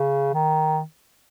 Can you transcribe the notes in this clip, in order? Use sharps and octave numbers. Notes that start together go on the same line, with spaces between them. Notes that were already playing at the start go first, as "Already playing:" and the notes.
Already playing: C#3
D#3